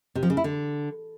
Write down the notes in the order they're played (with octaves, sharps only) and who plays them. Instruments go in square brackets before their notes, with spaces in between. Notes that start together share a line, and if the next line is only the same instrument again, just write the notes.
[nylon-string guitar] C3
F3
C#3
E4
D3